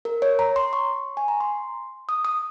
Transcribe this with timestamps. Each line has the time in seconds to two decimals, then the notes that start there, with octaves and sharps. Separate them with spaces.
0.05 A#4
0.22 C#5
0.39 A#5
0.56 C6
0.73 C#6
1.17 G#5
1.28 A#5
1.40 C6
2.09 D#6
2.25 D#6